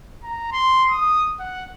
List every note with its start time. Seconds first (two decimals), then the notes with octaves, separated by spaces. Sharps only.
0.23 A#5
0.52 C6
0.91 D#6
1.40 F#5